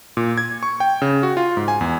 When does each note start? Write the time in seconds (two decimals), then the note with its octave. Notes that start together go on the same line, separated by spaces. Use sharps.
0.17 A#2
0.38 G#6
0.63 C#6
0.80 G5
1.02 C#3
1.23 F#4
1.37 F4
1.57 G#2
1.68 G#5
1.81 E2